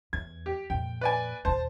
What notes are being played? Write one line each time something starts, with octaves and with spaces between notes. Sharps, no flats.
E2 G#6
G4
F2 A#2 G5
B4 D5 G#5
D#2 A#2 C5 A5